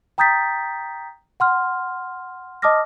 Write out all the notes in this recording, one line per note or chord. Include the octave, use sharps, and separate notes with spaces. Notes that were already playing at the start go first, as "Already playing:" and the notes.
G5 A#5 D#6 G6 A6 B6
F#5 C6 F6
D#5 A5 D6 D#6 F6 A#6